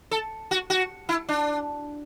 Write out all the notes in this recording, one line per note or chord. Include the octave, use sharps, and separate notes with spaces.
A4
F#4
F#4
E4
D4